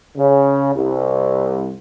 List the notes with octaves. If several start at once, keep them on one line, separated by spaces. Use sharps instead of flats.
C#3
C2